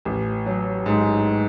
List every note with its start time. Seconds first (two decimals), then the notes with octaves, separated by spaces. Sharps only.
0.05 A1
0.46 F#3
0.86 G#2